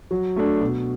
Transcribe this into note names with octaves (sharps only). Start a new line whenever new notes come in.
F#3
A3 D4
B2